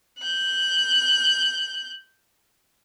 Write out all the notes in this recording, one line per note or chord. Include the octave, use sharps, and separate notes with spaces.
F#6 G6